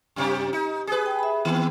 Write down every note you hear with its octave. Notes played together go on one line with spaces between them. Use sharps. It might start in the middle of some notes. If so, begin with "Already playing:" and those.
F#2 C3 G4
D#4
G#4 B4 D#6
G5
E5 B5
D#3 B3 C4 G5